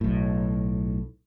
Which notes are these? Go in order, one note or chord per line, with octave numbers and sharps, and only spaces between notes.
B1 A2